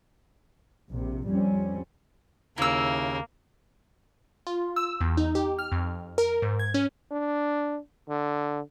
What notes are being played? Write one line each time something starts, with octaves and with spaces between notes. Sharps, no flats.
A#1 C3
F2 G3 C4 C#4
D#2 C#3 A#3 E4 E6
F4
E6
E2
D#4
G4
F6
F2
A#4
G#2
G#6
C#4
D4
D3